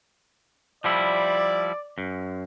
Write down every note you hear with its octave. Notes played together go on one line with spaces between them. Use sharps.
F3 G3 E4 D5
F#2